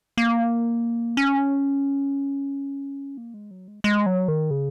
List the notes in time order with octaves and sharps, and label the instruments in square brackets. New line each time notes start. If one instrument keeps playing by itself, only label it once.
[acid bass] A#3
C#4
A#3
G#3
F#3
G#3
G#3
F#3
D#3
C#3